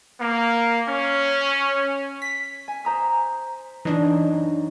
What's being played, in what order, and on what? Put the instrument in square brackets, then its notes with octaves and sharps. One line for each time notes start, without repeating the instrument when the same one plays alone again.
[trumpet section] A#3
C#4
[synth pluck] B6
[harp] G#5
C5 A#5 D#6
[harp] F#2 D#4 [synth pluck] E3 D4